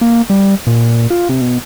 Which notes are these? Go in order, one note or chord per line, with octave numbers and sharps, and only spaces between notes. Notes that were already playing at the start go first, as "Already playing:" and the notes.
A#3
G3
A#2
F4
C3
B2